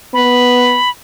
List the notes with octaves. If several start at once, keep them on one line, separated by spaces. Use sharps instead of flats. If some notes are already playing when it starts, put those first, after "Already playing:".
B3 B5